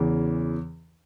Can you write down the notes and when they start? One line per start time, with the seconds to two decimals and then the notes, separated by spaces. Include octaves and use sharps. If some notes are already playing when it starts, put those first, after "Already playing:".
Already playing: E2 C#3 E3